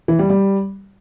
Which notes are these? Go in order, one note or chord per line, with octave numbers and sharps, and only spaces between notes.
E3
G3
G3